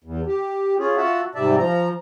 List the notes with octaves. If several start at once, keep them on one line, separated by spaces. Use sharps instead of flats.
E2
G4
C#4 F4 G#4
F4 F#4 E5 F#5 A5
G#2 C3 G3 D5 E5 A5
F3 A#5